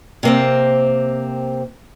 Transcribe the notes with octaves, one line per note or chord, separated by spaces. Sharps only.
C3 A#3 C4